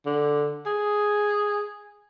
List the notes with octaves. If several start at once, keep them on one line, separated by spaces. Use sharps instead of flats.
D3
G#4